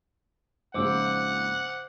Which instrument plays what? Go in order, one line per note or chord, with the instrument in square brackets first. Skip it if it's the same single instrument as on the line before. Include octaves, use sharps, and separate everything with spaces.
[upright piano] A#1 G#2 C#3 [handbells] C5 D6 E6 [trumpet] F#5